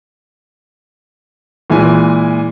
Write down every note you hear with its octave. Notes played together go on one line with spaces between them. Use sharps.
A#2 E3 G#3 G#5